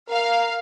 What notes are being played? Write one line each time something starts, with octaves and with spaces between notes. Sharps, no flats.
A#4 F5